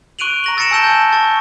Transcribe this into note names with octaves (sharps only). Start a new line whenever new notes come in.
C#6 F#6 D7 D#7 F7 F#7
A#5 A#6 F#7
E6 A6 A#6 C#7 D7 E7
G#5 A5 E6 G6 E7 G7
A5 G6
C#6 A6